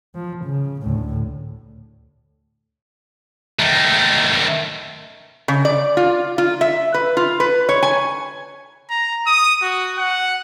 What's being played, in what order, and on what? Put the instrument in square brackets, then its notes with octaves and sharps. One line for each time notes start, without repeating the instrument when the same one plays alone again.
[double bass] F3
C#3
D2 A2
[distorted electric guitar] D#3 A3
[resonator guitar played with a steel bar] C#3
D5
F4
F4
E5
B4
F4
B4
C#5
G#5
[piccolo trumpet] A#5
D#6
F#4
F#5